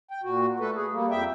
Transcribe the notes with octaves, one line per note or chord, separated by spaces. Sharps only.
G5
A#2 F#4
A3 A4 B4
G#4
G3 A#3
F2 E5 G5